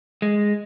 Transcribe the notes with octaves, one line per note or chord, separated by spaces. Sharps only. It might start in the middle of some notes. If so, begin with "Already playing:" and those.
G#3